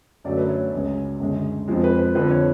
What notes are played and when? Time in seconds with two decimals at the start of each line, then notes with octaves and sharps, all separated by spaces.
0.24 F#2 D3 F#3 A3 D5
0.38 B4
0.49 C#5
0.72 C#2 C#3 G#3
1.20 F#2 D3 G#3
1.68 F2 F3 G#3
1.84 B4
1.99 B4
2.15 F2 D3 F3 B4
2.31 C#5